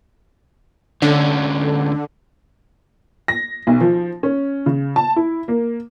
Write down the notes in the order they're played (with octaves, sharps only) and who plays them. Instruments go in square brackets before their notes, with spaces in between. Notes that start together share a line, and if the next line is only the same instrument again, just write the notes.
[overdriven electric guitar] D2 C#4 [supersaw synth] D3
[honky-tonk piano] A#6
B1
F3
C#4
C#3
A5
E4
A#3